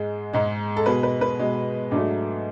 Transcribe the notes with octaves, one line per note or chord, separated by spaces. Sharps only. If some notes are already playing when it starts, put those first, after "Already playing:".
Already playing: G#2 G#3
G#2 G#3
A4
B2 G#3 B4
B4
B4
B2 G#3
G#2 F#3 A3 D4